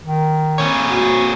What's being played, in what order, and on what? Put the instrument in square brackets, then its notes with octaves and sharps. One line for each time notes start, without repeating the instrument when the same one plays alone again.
[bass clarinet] D#3
[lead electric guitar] A#2 C#5
[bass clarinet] F#4